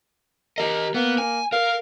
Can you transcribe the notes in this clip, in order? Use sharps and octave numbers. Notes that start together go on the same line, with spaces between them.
G4 A#4 D#5
A#3 B3
G#5
A#4 F5